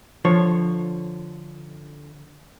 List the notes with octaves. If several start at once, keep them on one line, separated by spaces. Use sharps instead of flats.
D3 F3 C#5